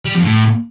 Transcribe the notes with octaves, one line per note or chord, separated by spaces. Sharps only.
G3
F2
A2